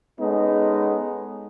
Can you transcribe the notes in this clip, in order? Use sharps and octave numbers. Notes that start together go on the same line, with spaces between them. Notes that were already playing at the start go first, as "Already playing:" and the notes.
G#3 B3 C#4 D#4 A4